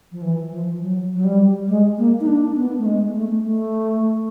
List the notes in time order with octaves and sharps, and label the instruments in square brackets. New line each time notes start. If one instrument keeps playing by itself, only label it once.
[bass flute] F3
E3
F3
F#3
F#3
G3
G#3
A#3
D#4
D4
B3
A3
G#3
A3
A3